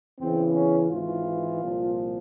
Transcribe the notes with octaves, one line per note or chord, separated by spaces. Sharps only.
E2 C#3 E3 C4
C#4
G#1 G#2 E3 F4
C2 A#2 F3